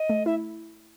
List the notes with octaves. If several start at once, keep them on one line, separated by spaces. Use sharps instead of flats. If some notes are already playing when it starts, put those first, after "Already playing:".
Already playing: D#5
A3
E4 E5